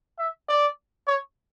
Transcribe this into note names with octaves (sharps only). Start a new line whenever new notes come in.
E5
D5
C#5